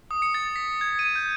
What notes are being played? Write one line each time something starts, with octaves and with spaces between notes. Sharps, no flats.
D#6
C#7
A6
B6
G#6
D#7
G6